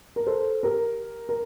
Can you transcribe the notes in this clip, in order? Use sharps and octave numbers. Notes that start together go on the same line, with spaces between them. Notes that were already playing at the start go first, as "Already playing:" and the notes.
A#4
A4 C5
G4 A#4
A#4